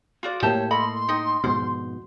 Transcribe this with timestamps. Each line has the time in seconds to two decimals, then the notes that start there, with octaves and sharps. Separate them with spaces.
0.23 F4 F#4 D5
0.43 A2 A3 A#3 G4 C5 C#5 A5
0.71 A4 D#5 B5 C6
1.09 D#4 D#5 G5
1.44 F2 G#2 B2 C5